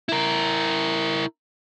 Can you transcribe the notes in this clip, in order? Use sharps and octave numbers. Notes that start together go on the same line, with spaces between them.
E4 A#4